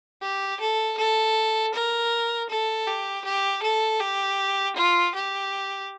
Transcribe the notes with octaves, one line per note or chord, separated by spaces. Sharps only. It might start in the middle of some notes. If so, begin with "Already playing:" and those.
G4
A4
A4
A#4
A4
G4
G4
A4
G4
F4
G4